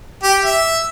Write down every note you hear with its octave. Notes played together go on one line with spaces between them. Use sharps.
G4
E5